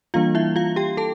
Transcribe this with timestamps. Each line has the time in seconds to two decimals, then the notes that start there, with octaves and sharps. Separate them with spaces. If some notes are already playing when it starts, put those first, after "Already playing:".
0.14 E3 G3 A#3 D4 F4 F5
0.35 E4 E5
0.56 F4 F5
0.76 G4 G5
0.97 A4 A5